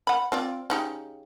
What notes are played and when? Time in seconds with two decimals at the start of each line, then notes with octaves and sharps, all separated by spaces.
0.07 F#5 B5
0.32 C4 F4 D5
0.70 C#3 D#4 G4